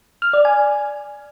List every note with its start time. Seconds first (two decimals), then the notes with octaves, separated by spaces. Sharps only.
0.22 F6
0.33 D5
0.45 G#5